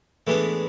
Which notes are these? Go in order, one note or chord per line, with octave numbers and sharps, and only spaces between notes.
A2 E3 G#3 B3 D4